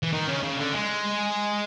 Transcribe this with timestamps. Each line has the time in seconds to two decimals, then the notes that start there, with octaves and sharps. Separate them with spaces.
0.03 E3
0.13 D#3
0.28 C#3
0.43 C#3
0.57 D3
0.72 G#3